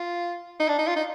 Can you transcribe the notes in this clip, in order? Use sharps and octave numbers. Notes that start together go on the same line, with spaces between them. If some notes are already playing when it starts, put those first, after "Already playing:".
Already playing: F4
D#4
D4
D#4
F4
D#4